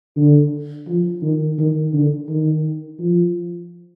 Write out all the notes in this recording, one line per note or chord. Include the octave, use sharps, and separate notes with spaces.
D3
F3
D#3
D#3
D3
D#3
F3